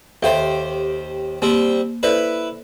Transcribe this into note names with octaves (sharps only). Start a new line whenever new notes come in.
D#2 G4 A4 C5 E5 F5
G3 A#3 C4
E4 A4 B4 C5 D5